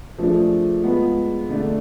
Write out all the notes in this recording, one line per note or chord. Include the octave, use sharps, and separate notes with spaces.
F3 A3 D4 G#4
G#3 B3 F4 G#4
D3 A3 D4